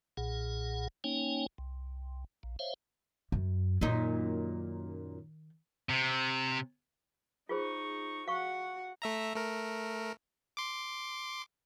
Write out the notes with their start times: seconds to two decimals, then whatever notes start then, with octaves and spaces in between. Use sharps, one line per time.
0.17 B1 A#2 G#4 F#5
1.04 A#3 C#4 D#4 C#5 G5 G#5
1.58 C2
2.43 A#1
2.59 C5 C#5 E5 F5
3.32 F#2
3.81 F#2 A#2 D#3 D#4
5.89 C3
7.49 D#4 F4 G#4 C5 C#6
8.28 F#4 F5 F#5 C#6
9.02 A3 E5 A#5
9.34 A3 A#4
10.57 C6 D6